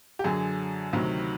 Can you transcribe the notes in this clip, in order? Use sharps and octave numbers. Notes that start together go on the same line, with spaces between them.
G4
F#2 D3 F#3 G#4
D2 C3 D#3 F#3